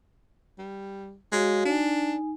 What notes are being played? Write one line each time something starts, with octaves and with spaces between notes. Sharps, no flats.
G3
G#3 F#4 C#5 F5
D4 D#4 G#5